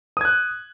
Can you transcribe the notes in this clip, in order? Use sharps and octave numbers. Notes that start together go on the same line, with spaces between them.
D#6 F#6 G#6